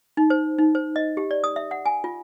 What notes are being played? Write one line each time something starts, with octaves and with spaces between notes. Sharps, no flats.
D#4
C5
D#4
C5
D#5
G4
D5
D#6
E5
F#5
G#5
F4